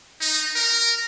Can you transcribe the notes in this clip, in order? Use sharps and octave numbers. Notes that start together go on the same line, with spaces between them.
D#4
A#4